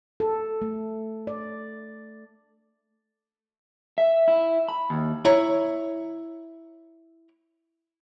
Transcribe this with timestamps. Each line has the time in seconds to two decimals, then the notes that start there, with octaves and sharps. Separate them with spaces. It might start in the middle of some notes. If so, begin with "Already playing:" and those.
0.20 A4
0.62 A3
1.27 D5
3.98 E5
4.28 E4
4.69 B5
4.90 D#2
5.25 E4 C#5 A#5